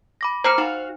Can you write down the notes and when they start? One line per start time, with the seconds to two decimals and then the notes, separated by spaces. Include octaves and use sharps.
0.21 B5 D6 A#6
0.44 A#3 C5 F6 C7 C#7
0.58 D#4 F#4 F5